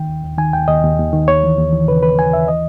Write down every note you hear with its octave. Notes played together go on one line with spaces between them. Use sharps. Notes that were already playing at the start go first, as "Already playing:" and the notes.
Already playing: D#3 G5
D#2
D#2
D#3 G#5
D#2 G5
D#2 D#5
D#2
D#2
D#3
D#2 C#5
E3
D#2
E3
C#3 B4
D#2 B4
D#2 G#5
D#2 E5
E3 D#5